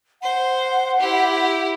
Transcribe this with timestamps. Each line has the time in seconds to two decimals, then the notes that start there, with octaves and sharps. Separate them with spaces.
0.22 C5 F#5
1.00 E4 G4